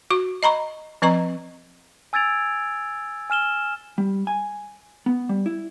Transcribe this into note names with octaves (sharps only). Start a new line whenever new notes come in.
F#4 C#6
D#5 A#5 B5 C#6
F3 C4 B4 D#5 A#5 C#6
G#5 E6 G#6 A6 D7 F7
G#5 F6 E7 G7
G3
G#5
B3
G3
E4